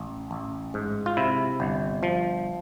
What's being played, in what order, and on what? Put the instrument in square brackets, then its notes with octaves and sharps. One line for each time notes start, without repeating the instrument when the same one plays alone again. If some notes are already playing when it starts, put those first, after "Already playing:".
Already playing: [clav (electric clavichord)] A1
A1
G#2
F4
C3 E4
G1
F3